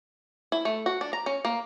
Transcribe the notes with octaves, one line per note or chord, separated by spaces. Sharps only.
E4
A3
F#4
D4
A#5
C#4
A#3